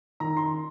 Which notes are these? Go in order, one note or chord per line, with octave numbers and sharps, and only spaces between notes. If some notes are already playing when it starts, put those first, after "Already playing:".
D#3 A#5
C6